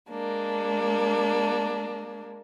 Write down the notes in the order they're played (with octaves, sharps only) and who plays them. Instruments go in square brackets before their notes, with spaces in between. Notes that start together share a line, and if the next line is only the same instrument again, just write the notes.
[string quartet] G#3 A#3 D4